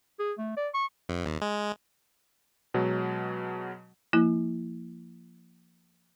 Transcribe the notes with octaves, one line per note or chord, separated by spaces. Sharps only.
G#4
A3
D5
C#6
F2
D#2
G#3
B2 F#3 G#3
F3 A#3 E4